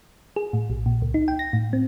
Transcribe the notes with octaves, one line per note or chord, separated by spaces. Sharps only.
G#4
A2
A#1
A#2
C#2
D#4
G5
A#6
A2
C4